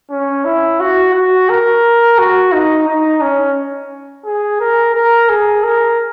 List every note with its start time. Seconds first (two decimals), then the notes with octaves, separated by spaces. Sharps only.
0.10 C#4
0.45 E4
0.80 F#4
1.14 F#4
1.49 A#4
2.18 F#4
2.52 D#4
2.88 D#4
3.21 C#4
4.25 G#4
4.60 A#4
4.94 A#4
5.29 G#4
5.64 A#4